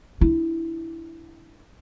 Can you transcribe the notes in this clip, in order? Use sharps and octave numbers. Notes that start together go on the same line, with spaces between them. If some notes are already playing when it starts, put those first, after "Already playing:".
D4 E4